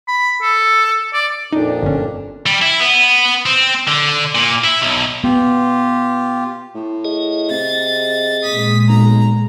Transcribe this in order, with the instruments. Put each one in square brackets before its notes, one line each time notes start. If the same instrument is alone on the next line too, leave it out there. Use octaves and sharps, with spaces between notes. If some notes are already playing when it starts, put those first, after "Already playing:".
[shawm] B5
A4
D5
[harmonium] F2 A#2 D4 [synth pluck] D#4
[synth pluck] G1 C#4
[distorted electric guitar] G3
E4
B3
C4
D3
A#2
E4
B1
[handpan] B3 [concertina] F4 G4
[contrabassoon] A2
[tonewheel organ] G#4 D#5
[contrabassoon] C3 [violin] A6
[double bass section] A#2 G#3 [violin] D#6 B6
[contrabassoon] B1 [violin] A#5